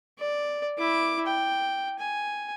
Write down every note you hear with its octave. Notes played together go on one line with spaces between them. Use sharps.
D5
E4 D6
G5
G#5